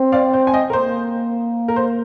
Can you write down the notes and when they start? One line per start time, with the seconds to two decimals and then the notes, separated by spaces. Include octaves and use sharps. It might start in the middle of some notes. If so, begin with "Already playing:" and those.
Already playing: C4
0.12 D5 F5
0.33 C5
0.47 G#5
0.54 D#5 G5
0.70 A#4
0.73 A#3 C5
1.68 A#4
1.76 C5